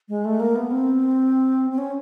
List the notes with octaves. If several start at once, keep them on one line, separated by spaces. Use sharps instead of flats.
G#3
A3
A#3
B3
C4
C4
C#4